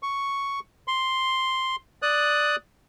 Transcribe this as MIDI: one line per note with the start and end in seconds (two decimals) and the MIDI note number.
0.03 0.60 85
0.88 1.76 84
2.02 2.56 74
2.02 2.56 87
2.02 2.56 90